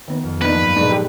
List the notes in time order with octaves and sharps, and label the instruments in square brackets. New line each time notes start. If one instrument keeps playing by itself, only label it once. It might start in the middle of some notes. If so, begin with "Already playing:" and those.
[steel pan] D#3 B3
[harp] F2
[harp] F3 A#3 [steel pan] B3 D4 D#4 [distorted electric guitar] B4
[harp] G2 F#3
[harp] A#2 A3 C#7 [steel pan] G#3 D4 D#4
[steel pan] G4